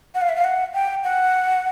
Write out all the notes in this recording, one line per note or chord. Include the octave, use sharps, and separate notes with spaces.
F#5
F5
E5
F5
F#5
G5
F#5